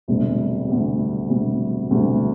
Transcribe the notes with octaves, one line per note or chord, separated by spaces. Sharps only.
E1 D2 C3 G3
E1 D2 C3 G3
E1 D2 C3 G3
E1 D2 C3 G3